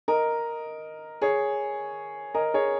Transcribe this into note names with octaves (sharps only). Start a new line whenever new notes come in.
A#4 D#5
G#4 C#5
A#4 D#5
G#4 C#5